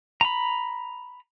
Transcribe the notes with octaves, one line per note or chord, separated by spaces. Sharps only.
A#5 B5